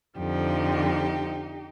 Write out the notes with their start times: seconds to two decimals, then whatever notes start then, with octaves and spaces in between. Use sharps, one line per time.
0.18 F2 D3 F3 D#4 G4